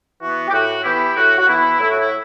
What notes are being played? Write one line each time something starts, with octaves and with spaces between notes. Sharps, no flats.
E3 B3 F#4
G4
A2 F#4
E3 B3 E4 G4
A2 F#4
F#4
E3 B3 E4
A2 E4
F#4
E4